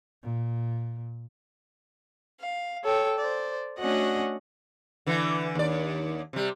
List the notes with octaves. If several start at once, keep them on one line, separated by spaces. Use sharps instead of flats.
A#2
F5
A4 C#5 G5
C5 D5
A3 C#4 D4 F#4 D#5 F#5
D3 E3
D#2 D5
C3 G3